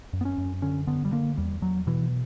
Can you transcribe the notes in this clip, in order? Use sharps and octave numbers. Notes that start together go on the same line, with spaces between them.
F#2
B3
C#4
F#2
D3 C#4
D3 B3
G3
D3 A#3
E2 G3
E2 F#3
B2 E3